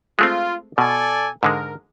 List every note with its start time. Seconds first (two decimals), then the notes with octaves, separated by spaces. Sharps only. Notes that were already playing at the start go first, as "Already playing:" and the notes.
0.19 G#3 A3 C4 F4
0.78 B2 A4 D5 G#5
1.43 G#2 D3 G#3 A#4